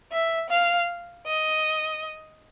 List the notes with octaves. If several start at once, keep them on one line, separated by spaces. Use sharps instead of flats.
E5
F5
D#5